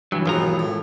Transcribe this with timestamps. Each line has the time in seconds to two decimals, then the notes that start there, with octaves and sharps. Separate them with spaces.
0.12 G2 E3 F#3
0.26 G#1 D#2 B2 F3 A#5
0.59 A2